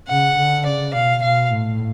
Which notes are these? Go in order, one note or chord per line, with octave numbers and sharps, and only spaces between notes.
C#3 F#5
D3
C#3 D5
B2 F5
B2 F5
A2